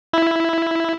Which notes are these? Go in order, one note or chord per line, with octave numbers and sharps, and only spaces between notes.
E4